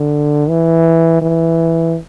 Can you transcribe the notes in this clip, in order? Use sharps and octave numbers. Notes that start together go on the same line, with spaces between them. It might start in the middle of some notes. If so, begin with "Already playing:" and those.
Already playing: D3
E3
E3